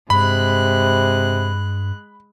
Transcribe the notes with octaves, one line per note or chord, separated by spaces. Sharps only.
G2 C3 G#3 B5 F#6